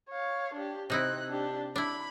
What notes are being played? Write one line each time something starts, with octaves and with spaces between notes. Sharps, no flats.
C#5 F5
D4 G4
C3 C4 D#4 E4 F#6
D4 G4
D4 E4 B5